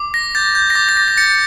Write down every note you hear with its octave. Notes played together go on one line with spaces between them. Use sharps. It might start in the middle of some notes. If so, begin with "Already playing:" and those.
Already playing: D6
A#6
G6 A6
G6
A#6
D6 A6
A6
A#6
A#6
G6 A6 C#7